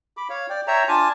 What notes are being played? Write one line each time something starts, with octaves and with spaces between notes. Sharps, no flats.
B5 D6
C#5 F5
D5 G5
C#5 E5 G5 A#5
D4 F4 G#5 A5